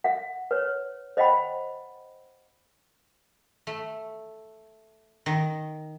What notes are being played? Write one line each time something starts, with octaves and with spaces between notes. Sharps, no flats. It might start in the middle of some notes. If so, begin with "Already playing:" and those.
E5 F#5
B4 C#5
C5 D#5 E5 F#5 G5 B5
A3
D#3